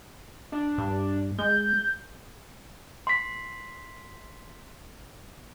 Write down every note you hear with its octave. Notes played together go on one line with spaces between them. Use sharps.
D4
G2
G#3 G6
C6 B6